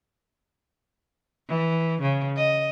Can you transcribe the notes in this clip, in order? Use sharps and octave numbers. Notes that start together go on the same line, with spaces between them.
E3
C#3
D#5